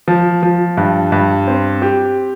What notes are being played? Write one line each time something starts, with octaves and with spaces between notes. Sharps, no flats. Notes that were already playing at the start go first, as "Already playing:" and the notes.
F3
F3
G2
G2
C4
G4